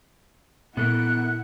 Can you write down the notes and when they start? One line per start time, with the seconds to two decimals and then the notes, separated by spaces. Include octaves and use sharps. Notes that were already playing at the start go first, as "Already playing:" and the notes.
0.77 A#2 B3 E4 A4 A#4 F#5 F#6